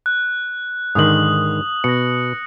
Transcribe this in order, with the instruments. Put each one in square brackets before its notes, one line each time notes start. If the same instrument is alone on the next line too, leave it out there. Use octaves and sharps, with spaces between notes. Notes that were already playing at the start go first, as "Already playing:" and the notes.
[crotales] F#6
[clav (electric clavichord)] G#2 D3 D#3 [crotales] D#6 F#7
[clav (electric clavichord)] B2 [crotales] A#6 C#7